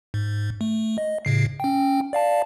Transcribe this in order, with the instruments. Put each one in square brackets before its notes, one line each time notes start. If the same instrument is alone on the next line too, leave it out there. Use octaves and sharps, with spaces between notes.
[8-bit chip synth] G#2
A3
D#5
A2 C#3 C7
C#4 G5
D5 F5 A5